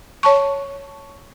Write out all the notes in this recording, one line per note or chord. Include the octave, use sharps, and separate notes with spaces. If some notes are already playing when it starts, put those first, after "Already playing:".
C#5 A5 C#6